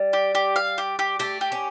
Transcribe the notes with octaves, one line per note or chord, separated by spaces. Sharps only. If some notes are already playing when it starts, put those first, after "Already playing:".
Already playing: G3
G4
G4
F5
G4
G4
A3 G4
G4
C#4